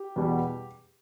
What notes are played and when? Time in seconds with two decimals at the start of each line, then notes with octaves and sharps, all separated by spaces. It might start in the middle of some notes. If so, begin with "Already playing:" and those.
Already playing: G4
0.16 E2 B2 G3